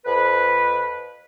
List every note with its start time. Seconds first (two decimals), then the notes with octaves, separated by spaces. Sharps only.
0.05 F2 B4